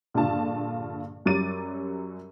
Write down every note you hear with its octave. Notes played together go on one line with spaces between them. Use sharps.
A#1 G2 D3 F4 A5
F#2 F#3 G3 D6 A6 D#7